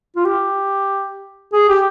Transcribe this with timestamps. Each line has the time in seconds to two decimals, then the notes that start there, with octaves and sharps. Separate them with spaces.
0.16 F4
0.25 G4
1.53 G#4
1.69 G4